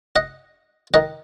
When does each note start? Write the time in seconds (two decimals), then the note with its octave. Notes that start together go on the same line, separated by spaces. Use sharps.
0.16 D#5 F#5
0.94 D#3 D#5 F#5